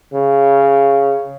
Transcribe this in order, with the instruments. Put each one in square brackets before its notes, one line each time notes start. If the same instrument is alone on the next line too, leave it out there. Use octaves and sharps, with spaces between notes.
[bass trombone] C#3